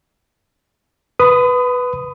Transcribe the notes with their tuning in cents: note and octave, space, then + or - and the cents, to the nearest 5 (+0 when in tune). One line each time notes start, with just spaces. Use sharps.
B4 +0 B5 +35 D#6 +0